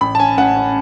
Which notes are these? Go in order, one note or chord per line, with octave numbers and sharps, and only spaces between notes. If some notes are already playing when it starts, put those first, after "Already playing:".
A1 B5
A5
C#4 G#5
A1 F#5
C#4